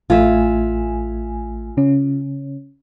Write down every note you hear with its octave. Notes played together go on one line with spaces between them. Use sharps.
A1 A3 F4 E5 G#5
C#3 C#4